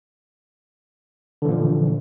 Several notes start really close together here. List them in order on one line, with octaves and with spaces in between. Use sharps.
D3 E3 A#2 F3